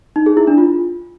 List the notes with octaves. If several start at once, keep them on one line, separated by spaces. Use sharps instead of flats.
D#4
G#4
E4
D4
F4